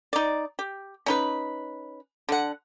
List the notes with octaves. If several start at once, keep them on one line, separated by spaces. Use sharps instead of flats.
D#4 D5
G4
C#4 D#4 B4
D3 F#5